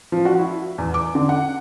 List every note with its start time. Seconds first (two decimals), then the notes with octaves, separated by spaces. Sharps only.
0.12 F3
0.25 F#4
0.38 E4
0.78 E2
0.94 D6
1.15 D3
1.29 F#5